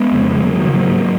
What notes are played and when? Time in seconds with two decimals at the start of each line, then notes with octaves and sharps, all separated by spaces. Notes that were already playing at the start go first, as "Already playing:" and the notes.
Already playing: G#3 B3
0.12 F2 C#3
0.35 G#3
0.43 F2 C#3 F#3 A#3
0.58 D#3 F#3
0.73 G#2 F#3 A#3